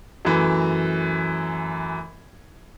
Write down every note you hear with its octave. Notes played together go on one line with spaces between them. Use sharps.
F#2 E3 A3